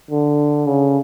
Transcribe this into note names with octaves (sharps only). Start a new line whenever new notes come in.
D3
C#3